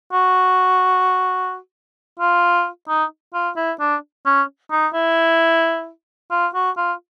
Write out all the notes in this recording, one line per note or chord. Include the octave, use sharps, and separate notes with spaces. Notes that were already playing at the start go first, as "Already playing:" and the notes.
F#4
F4
D#4
F4
E4
D4
C#4
D#4
E4
F4
F#4
F4